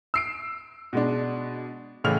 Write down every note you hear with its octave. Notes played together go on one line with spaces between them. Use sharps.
E6 C7 D7
B2 G#3 D4
A1 A2 C#3 E3 F6 F7